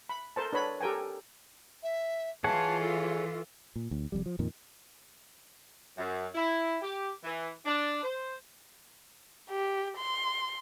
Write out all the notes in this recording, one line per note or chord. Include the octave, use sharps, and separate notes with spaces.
B5
A4 A#4 C5 A5
D4 B4 C#5 B5
G4 A4 A#4 G5 G#5
E5
E3 F4 G#4 C#5 F#5 A5
A4
A#2
D2
F1 F2 G3
F3
F2 A#2 D#3
F#2
E4
G4
E3
D4
C5
G4
C6